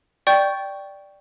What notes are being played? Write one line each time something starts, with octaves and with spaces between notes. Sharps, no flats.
D5 G5 C#6 G6